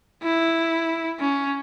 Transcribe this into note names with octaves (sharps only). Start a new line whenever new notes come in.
E4
C#4